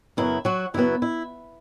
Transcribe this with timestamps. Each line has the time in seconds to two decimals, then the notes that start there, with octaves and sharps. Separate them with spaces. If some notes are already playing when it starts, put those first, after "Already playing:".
0.17 F#2 C#3 F#3 B3 E4
0.45 F#3 F#4
0.74 F#2 C#3 F#3 B3 E4
1.02 E4